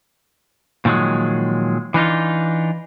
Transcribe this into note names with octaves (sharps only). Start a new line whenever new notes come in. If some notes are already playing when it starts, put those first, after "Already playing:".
A#2 D#3 F3 F#3 G#3
E3 D4 D#4 F4